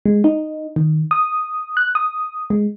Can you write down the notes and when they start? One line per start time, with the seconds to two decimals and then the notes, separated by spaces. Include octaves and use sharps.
0.06 G#3
0.24 D#4
0.76 D#3
1.11 D#6
1.77 F#6
1.95 D#6
2.50 G#3